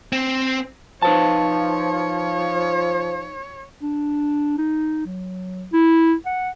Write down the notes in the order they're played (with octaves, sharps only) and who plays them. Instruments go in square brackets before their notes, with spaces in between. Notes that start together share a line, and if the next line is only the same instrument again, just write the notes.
[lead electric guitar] C4
[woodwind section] F3 [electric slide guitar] D#4 B4 A5 [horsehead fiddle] C#5
[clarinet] D4
D#4
F#3
E4
F#5